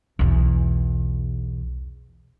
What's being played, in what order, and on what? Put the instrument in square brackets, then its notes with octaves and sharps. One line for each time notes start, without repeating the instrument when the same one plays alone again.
[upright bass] B1 E2